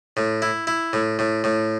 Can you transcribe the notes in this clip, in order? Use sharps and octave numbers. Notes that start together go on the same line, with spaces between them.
A2
E4
E4
A2
A2
A2